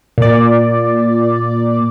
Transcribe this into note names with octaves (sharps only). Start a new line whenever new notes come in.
A#2 D5